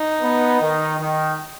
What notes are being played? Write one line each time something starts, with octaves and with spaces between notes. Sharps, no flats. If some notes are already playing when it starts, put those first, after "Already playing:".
Already playing: D#4
B3
D#3
D#3